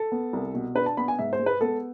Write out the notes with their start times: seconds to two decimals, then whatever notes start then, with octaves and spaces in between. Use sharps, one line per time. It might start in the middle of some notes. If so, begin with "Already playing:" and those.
Already playing: A4
0.12 B3
0.33 C2
0.54 B2
0.75 D4 B4
0.86 A5
0.97 B3 B5
1.08 G#5
1.19 G#2 E5
1.33 C5
1.39 G#3
1.46 B4
1.61 B3 A4